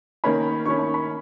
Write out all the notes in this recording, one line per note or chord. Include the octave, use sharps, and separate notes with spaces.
D#3 A#3 C#4 B5
D#3 A#3 C#4 C#6
B5
B5